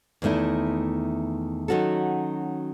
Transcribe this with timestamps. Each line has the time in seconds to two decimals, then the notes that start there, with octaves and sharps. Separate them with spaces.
0.22 E2 D#3 A3 E4
1.68 D#3 F#3 C#4 F#4 A4